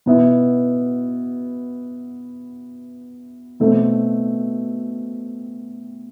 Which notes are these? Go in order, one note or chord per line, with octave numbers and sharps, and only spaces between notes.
B2 B3 E4
B2 A3 C4